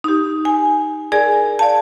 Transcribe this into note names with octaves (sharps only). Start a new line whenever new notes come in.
D#4 G4
G#5
G#4 A#4 D5 G#5
D5 F5 A5